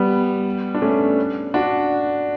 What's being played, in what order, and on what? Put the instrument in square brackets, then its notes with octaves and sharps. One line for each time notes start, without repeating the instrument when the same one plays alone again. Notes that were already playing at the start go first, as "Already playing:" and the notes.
Already playing: [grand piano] G3 B3
D4
A3 C#4
D4 F#4